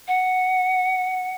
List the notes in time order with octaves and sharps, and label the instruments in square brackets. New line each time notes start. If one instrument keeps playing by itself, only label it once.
[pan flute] F#5